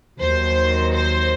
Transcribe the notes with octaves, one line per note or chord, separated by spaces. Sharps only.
D#2 D#3 F#3 C5
C5